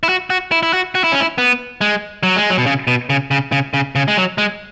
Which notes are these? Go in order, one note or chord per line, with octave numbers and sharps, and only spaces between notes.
E4
F#4
F#4
E4
E4
F#4
F#4
E4
C#4
E4
B3
G#3
F#3
G#3
F#3
B2
C#3
B2
C#3
C#3
C#3
C#3
C#3
G#3
F#3
G#3